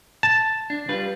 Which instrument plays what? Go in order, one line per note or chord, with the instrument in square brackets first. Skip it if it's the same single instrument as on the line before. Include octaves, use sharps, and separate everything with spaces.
[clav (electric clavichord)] A5
[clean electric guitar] D4
G3 F4 B4